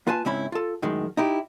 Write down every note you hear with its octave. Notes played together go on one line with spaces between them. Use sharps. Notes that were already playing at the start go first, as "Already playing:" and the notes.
A#3 F4 B4 G#5 A5
C#2 G#2 C4 C#4 E4 B5
F4 A4
F#2 A2 D#3 G#3
D#4 E4 G4